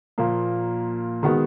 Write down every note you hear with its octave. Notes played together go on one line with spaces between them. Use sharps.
A#2 F3 A#3
D#3 G#3 B3 F#4